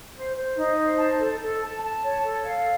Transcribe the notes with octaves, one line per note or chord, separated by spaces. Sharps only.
C5
C5
D#4
C5
A5
A4
A4
A5
A5
C#5
A4
F5